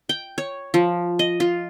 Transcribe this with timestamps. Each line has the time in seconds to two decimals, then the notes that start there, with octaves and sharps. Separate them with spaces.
0.09 G5
0.38 C#5
0.74 F3
1.19 D#5
1.40 F4